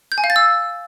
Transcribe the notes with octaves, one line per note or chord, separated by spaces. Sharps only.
G6
G#5
F5
A6
E6